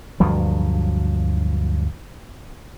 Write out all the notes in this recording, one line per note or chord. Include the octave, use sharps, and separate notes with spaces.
D2 G2 F3 F#3